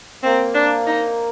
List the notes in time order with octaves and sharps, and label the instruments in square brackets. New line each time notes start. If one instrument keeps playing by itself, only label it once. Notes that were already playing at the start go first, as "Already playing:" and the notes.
[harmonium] A#3 [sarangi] C4
[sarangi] D4
D#4